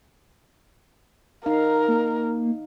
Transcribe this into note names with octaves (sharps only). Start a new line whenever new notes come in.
D#4 A#4 F5
A#3